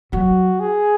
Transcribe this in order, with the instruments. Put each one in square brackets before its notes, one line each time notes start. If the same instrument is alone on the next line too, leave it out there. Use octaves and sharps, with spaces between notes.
[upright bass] F#3 [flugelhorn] F#4
[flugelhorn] G#4